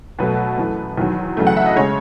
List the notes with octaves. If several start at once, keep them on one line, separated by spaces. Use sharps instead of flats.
B2 F#3 A3 B4
F#2 E3 A3
E2 D#3 F#3
E2 C#3 F#3 A3
F#5
E5
D#5
C#3 G#3 C#5